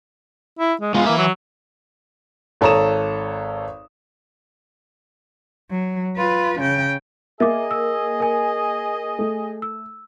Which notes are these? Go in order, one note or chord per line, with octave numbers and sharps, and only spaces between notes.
E4
G#3
G#3 B3 F4
E3 A#3 E5
F#3
G#1 A4 C#5 A#5 D#6 E7
F#3
F4 B4
C#3 G5
A#3 G#4 D#5 E5 D6
E6
A#4 G#5
A3
E6